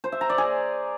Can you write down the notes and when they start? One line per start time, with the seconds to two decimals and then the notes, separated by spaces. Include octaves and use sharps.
0.04 C5
0.12 E5
0.21 A#5
0.30 D5
0.38 G#4